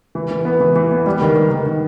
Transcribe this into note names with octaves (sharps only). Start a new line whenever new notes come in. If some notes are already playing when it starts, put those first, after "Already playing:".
E3
E3
B3
E3
E3
B3
G3
D#3
D#3
D#3
D#3